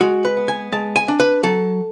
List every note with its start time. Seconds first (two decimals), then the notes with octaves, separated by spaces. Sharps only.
0.01 G#3 F#4
0.25 B4
0.37 B3
0.48 G#5
0.72 G#3 A5
0.96 G#5
1.08 D4
1.20 B4
1.43 F#3 A4